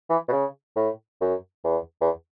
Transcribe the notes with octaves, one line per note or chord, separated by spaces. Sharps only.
E3
B2
C#3
A2
F#2
E2
E2